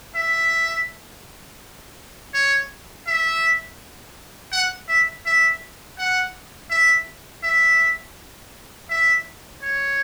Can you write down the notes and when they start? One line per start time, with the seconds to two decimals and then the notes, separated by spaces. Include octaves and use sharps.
0.16 E5
2.34 C#5
3.07 E5
4.52 F#5
4.89 E5
5.26 E5
5.99 F#5
6.71 E5
7.43 E5
8.90 E5
9.62 C#5